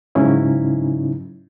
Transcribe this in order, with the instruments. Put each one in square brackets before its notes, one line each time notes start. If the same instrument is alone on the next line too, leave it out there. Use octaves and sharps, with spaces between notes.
[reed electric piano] G#2 C#3 F#3 C#4 D#4 E4